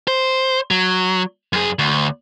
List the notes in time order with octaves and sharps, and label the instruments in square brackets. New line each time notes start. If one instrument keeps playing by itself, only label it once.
[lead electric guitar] C5
F#3
F#2 G#4
D2